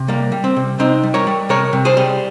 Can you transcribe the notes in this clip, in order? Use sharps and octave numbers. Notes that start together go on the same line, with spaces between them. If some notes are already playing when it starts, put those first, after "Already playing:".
Already playing: C3
G3 A#3
G3
C4
C3
C3 C4 D#4
G3
A#4 C#5
G3
C3 A#4 C#5
C3
G#4 C5
G3